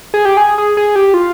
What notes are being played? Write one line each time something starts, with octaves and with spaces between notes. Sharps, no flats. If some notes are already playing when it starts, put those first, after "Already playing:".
G#4
G4
G#4
G#4
G#4
G4
F4